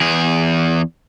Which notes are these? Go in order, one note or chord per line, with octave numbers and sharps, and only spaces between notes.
E2 G#4